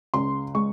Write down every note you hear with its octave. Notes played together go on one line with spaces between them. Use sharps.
C#2 C6
G#3 C#6